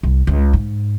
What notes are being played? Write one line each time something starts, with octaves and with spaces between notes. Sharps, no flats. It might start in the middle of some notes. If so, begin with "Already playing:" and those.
C2
C#2
G#2